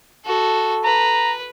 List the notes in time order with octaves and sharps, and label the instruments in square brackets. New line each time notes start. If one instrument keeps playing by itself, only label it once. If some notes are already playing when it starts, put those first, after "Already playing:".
[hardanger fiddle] F#4 A4
[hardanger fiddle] B4 [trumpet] A#5